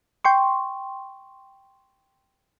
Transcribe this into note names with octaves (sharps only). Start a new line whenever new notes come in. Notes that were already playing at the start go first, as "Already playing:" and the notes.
G5 C6 C#6